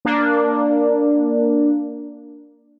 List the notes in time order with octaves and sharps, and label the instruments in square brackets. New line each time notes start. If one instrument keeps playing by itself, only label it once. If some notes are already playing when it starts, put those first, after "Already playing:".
[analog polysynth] A#3 D4